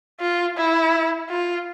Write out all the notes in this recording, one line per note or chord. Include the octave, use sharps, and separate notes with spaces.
F4
E4
F4